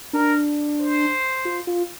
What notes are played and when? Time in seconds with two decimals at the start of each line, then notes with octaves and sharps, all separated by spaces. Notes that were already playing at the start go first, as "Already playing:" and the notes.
0.13 D4 A#4
0.80 C5
1.45 F4
1.67 F4